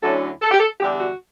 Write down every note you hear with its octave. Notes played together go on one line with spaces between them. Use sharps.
D2 D3 F#3 C#4 E4 A4
A4
G4
A4
E2 D3 G3 D4 G4
F#4